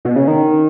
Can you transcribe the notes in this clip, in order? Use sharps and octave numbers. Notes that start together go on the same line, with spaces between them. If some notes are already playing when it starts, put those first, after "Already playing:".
B2
C#3
D#3